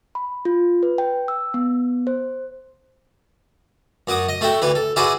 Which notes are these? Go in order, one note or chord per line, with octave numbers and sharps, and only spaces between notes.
B5
F4
B4
G5
E6
B3
C5
F#2 F#4 D6 D#6
D#5
A3 F#4 E5 G5
D2 E3 B4
A4
E4 F#4 G#4 B4 D5 E5